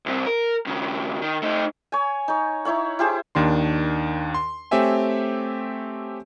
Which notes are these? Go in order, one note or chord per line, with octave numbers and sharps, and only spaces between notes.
C2 C4
A#4
D#2 C#3
D#3
A3 D#4
C#5 G#5
D#4 C#5
D#4 E4 C#5 F#5
E4 G4 G#4 C5
D#2 D#3 D4 C6
C6
A3 C4 G4 C#5 E5 G#5